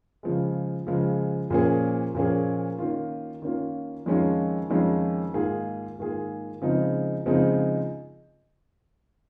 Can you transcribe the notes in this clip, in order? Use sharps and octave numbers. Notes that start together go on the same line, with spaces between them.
C#3 F3 G#3
C#3 F3 G#3
A#2 F3 A#3 C#4 G#4
A#2 F3 A#3 C#4 G#4
D#3 A#3 C#4 F4
D#3 A#3 C#4 F4
F2 D#3 G#3 C#4 F4
F2 D#3 G#3 C#4 F4
G#2 D#3 A#3 F4 G#4
G#2 D#3 A#3 F4 G#4
C#3 F3 G#3 C4 D#4
C#3 F3 G#3 C4 D#4